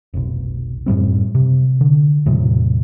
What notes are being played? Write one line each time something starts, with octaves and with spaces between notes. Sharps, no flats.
F1 B1
F#2 A2 G3 C4
C3
D3
E2 A2 C3 F#3